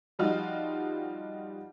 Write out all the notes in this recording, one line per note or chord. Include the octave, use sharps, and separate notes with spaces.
F3 G3 D#4 F4 F#4